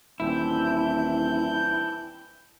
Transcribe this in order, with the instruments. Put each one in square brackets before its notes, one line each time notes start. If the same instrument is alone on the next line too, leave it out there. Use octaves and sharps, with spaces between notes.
[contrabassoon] D#1 [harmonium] E3 C4 D4 [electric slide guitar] E4 [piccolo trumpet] G6